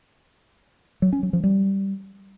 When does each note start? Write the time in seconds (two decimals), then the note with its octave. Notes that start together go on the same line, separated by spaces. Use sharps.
1.02 F#3
1.13 C#4
1.23 F#3
1.33 F3
1.44 G3